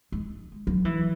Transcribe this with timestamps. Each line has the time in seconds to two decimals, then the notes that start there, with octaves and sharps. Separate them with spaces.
0.12 G#3
0.67 F#3
0.85 E3